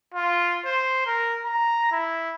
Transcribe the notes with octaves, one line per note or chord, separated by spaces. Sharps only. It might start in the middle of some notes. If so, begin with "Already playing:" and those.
F4
C5
A#4
A#5
E4